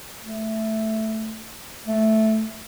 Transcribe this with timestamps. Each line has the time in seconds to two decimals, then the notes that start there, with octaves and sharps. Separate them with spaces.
0.24 A3
1.87 A3